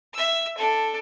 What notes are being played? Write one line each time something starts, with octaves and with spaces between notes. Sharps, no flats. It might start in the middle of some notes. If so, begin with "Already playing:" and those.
E5 E6
D4 A4